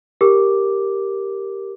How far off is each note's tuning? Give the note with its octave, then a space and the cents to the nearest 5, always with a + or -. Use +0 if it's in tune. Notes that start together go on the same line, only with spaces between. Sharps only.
G4 +0 A#4 +0 D6 +0